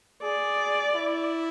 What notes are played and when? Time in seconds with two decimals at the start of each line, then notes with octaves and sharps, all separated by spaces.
0.23 G#4 D5
0.94 E4